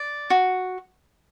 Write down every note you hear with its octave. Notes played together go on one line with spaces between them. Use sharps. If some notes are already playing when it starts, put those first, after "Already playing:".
Already playing: D5
F#4